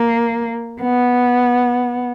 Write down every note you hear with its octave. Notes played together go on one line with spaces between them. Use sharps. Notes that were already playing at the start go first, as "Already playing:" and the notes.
Already playing: A#3
B3